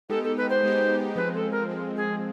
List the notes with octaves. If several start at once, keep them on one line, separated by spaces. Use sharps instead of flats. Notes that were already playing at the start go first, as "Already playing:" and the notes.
G#3 B3 D#4 G4 A4
A4
B4
C5
G#3 B3 D#4 G4
F3 G#3 C4 B4
A4
A#4
F3 G#3 C4
G#4